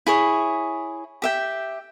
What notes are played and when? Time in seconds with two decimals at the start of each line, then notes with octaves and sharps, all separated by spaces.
0.06 E4 G#4 C#5
1.22 G4 E5 G5